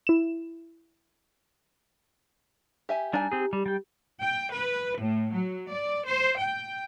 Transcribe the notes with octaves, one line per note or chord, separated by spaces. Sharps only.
E4 E7
G4 E5 G#5
G3 D4 D#4 G#5
C4 G4 G#4
G3
G3 G5
G5
B4
A2
F#3
D5
C5
G5